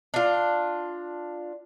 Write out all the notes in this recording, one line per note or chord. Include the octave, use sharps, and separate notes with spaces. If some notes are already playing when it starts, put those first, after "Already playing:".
D4 F4